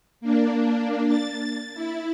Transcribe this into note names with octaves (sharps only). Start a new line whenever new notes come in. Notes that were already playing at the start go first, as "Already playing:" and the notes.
A#3 D4
A6
E4